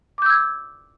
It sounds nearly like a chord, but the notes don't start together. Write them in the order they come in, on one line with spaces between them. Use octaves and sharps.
D6 G6 E6 G#6